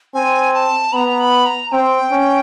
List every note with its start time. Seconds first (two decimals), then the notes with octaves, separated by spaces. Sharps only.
0.14 C4 G#5
0.54 A5
0.93 B3 A#5 B5
1.20 B5
1.46 A#5
1.72 C4 G5
2.12 C#4